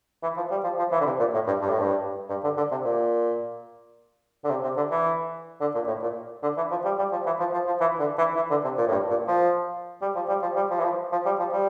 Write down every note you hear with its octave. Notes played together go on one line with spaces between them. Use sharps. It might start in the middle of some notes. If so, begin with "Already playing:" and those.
E3
F3
G3
F3
F3
E3
D3
C3
A#2
A2
G2
G2
A2
G2
G2
D3
D3
C3
A#2
D3
C3
C3
D3
E3
D3
A#2
A2
A#2
D3
E3
F3
G3
G3
F3
E3
F3
F3
F3
E3
D3
E3
E3
D3
C3
A#2
A2
G2
A#2
F3
G3
F3
G3
F3
G3
F3
E3
F3
F3
G3
F3
G3